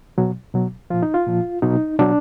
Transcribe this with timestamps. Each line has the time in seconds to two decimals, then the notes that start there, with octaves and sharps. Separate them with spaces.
0.18 B2 F#3
0.54 B2 F#3
0.90 A#2 F3 F4
1.03 D#4
1.14 F4
1.27 A#2 F3
1.62 B2 F#3 D#4
1.99 B2 F#3 D4